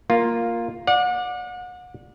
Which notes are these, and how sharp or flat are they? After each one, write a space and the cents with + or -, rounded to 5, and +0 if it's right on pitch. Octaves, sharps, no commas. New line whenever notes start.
A#3 +0 F4 +0
D5 +10 F#5 -35